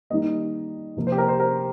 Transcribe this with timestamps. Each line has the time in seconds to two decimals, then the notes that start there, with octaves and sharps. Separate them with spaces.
0.10 D#3 G3 A#3 D#5
0.97 C3 F3 A#3
1.07 C5
1.12 G4
1.18 A#4
1.28 C5
1.40 A#4